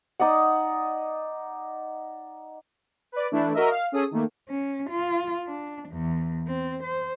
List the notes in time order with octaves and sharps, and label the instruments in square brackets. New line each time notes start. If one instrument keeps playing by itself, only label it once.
[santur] D#4 D5 D#5 F#5
[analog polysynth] B4 D5
E3 A3 D4 E4
F#4 A#4 D#5 E5
F5
C#4 G#4 A4 D#6
D#3 A3 A#3
[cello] C#4
F4
D4
E2
C4
C5